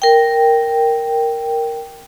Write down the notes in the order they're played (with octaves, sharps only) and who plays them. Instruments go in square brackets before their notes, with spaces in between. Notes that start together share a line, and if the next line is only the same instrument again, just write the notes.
[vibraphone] A#4 G5